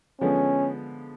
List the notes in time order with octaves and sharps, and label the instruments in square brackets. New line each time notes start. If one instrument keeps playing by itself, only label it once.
[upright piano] D3 F3 G#3 B3 [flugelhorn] C#4